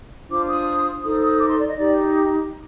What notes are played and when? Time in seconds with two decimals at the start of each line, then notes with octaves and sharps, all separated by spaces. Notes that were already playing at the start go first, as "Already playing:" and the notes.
0.29 D4 F4 C5 D6
0.47 D#6
1.03 D#4 A4 C5 D#6
1.22 D#6
1.40 D6
1.49 C6
1.59 D5
1.67 D#5
1.77 D#4 G4 D5